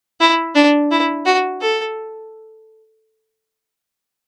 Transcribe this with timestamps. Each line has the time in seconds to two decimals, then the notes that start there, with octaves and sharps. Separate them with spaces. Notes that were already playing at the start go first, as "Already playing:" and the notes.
0.20 E4
0.55 D4
0.91 E4
1.26 F#4
1.61 A4